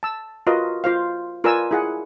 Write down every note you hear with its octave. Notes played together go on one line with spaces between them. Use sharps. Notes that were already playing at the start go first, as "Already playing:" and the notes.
A5 E6
F4 F#4 A#4 B4 D#5
F4 C5 F5
F4 A#4 B4 D5 G#5 E6
E4 G#4 F#5